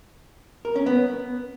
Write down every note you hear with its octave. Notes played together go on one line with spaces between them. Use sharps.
A#4
C#4
B3